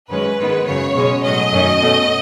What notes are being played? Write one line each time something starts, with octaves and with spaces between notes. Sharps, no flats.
F#2 D#3 G#3 C#4 B4
G#2 D#3 G#3 B3
F#2 C#3 F#3 C#5
B2 G#3 C#4
A2 F#3 C#4 D#5
F#2 D#3 A3 C#4
B2 A3 C#4